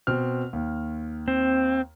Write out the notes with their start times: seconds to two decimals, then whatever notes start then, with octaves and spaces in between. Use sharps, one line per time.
0.07 B2 C4 F6
0.53 D#2
1.28 C4